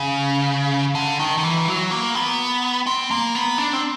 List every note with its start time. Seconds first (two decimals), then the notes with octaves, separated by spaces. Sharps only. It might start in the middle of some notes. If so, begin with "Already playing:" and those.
Already playing: C#3
0.95 D3
1.19 D#3
1.38 D#3
1.43 E3
1.68 F#3
1.91 A#3
2.15 B3
2.86 C4
3.11 A#3
3.35 B3
3.58 D4
3.73 C4